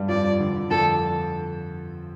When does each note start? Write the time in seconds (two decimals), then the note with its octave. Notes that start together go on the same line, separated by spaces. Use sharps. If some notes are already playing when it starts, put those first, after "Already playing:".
Already playing: G2 G3
0.09 F2 F3 D5
0.40 D3
0.56 D3
0.71 F2 F3 A4